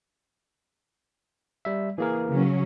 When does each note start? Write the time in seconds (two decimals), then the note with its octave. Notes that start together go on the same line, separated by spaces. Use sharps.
1.65 G3 E5
1.98 E3 A#3 G#4 A#4
2.28 C#3 F#3 C#4